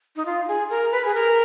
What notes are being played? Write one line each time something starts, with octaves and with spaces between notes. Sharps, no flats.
D#4
F4
G#4
A#4
B4
G#4
A#4